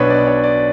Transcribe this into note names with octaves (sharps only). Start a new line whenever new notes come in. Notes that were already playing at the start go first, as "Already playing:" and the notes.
Already playing: B1 B2 D4 B4 C#5
D5
C#5
D5